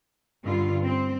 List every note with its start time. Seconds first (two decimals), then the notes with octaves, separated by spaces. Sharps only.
0.44 G2 D3 F4
0.84 C4